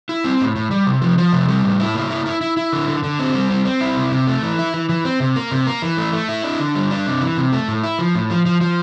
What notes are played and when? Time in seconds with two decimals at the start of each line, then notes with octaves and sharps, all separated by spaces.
0.09 E4
0.24 C4
0.40 A2
0.56 A2
0.71 G3
0.87 C3
1.02 F3
1.18 F3
1.33 C3
1.49 G3
1.64 A2
1.80 E4
1.95 A#3
2.10 E4
2.26 E4
2.41 E4
2.57 E4
2.73 D3
2.88 D3
3.04 D3
3.19 C4
3.35 G3
3.50 C4
3.65 C4
3.81 E4
3.96 C3
4.12 C3
4.27 A3
4.43 E3
4.59 E4
4.74 E3
4.89 E3
5.05 C4
5.20 C3
5.36 A#3
5.51 C3
5.67 A#3
5.82 E3
5.97 A3
6.13 A3
6.29 E4
6.44 D4
6.59 D3
6.75 G3
6.91 D4
7.06 C3
7.22 E3
7.37 C3
7.53 A3
7.68 A2
7.84 E4
7.99 F3
8.15 A2
8.30 F3
8.46 F3
8.61 F3